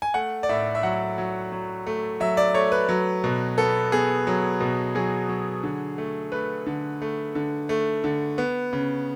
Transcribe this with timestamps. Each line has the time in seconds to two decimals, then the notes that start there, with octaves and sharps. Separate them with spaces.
0.02 G#5
0.14 A3 F#5
0.43 D5
0.49 A2 E5
0.75 E5
0.83 F#3 F#5
1.18 F#3
1.52 F#3
1.87 A3
2.20 F#3 E5
2.37 D5
2.54 A3 C#5
2.72 B4
2.89 F#3
3.24 B2
3.58 B3 A4
3.92 B3 G#4
4.27 F#3
4.60 B2
4.95 F#3 G#4
5.29 F#3
5.63 D3
5.98 A3
6.32 A3 B4
6.66 D3
7.02 A3
7.35 D3
7.69 A3
8.04 D3
8.38 B3
8.73 C#3